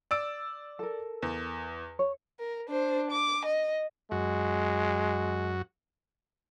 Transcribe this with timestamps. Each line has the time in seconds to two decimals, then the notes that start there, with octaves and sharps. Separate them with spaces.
0.11 D5 E6 D7
0.79 A4 A#4
1.22 E2
1.99 C#5
2.39 A#4
2.69 D4 C5
3.11 D6
3.45 D#5
4.11 F#2 G#3 F#4